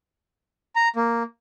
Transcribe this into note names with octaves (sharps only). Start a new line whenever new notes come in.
A#5
A#3